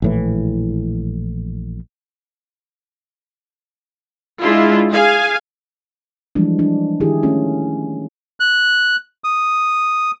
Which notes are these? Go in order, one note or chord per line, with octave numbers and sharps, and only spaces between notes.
A#1 A2 E3
G#3 D4 E4 F4
G#4 F5 G#5
E3 F3 G3 G#3 D4
D4
D#3 E4 G4 G#4
A3 C#4 F4
F#6
D#6